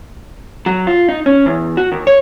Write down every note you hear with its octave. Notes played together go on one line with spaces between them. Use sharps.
F#3
F4
D#4
C#4
E2
F#4
D#2
C#5